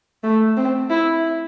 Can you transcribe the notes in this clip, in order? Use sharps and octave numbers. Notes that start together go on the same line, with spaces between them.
A3
C4
E4